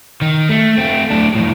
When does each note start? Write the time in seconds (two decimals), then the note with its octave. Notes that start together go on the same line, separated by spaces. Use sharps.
0.21 D#3
0.49 A3
0.78 A3 C4
1.11 A2 D4
1.35 F2 A2